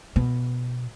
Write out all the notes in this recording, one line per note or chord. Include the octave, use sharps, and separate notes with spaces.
B2